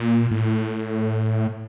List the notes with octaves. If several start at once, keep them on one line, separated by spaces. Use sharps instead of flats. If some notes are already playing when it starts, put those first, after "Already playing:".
Already playing: A#2
A2